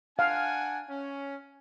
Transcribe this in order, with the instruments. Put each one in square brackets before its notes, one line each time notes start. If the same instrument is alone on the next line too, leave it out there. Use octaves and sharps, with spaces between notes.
[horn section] D4 F#5 G#5 [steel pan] F5
[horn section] C#4